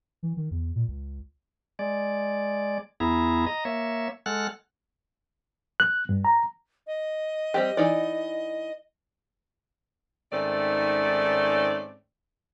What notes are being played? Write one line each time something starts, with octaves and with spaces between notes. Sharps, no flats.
E3
D#3
E2
A#2
C#2
G#3 D5
E2 B3 E4 G#4 A#5
D#5 A#5
A#3 C#5 E5
G#3 A4 F#5 F6 F#6
F#6
G2
A#5
D#5
G3 C4 G4
E3 D#4 D5
G#2 D#3 A3 C4 C#4 D5